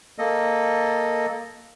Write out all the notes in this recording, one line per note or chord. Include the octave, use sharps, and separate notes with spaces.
A#3 A4 D#5